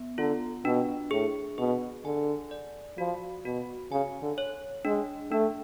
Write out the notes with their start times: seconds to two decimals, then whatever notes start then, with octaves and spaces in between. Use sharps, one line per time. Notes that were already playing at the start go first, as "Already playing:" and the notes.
Already playing: B3
0.18 D3 F4
0.65 B2 D4
1.11 A2 G#4
1.58 B2 G#4
2.05 D3 G#5
2.51 D5
2.98 F3 F#4
3.45 B2 F#4
3.91 C#3 G#5
4.22 D3
4.38 C#5
4.85 G#3 D4
5.31 A3 D4